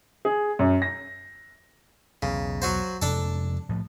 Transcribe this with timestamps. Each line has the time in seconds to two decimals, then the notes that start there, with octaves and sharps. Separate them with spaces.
0.25 G#4
0.59 F#2
0.82 A#6
2.22 B1 E2 C#3
2.62 F#3 F#4 C5
3.02 F2 C3 G#3 D4 A4
3.69 A2 F3 A3